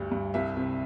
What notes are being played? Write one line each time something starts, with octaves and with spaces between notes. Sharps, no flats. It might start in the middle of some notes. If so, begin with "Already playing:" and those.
Already playing: D2 G2 G3
G2
C2 E5
C3